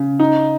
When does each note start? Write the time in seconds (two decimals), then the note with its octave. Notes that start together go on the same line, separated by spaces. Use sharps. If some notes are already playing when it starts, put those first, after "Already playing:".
Already playing: C#3
0.19 D#4